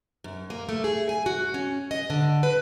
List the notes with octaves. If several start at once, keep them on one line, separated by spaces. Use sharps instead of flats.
F#2
A#3
A3
G#4
G#5
F#4
C#4
D#5
D3
B4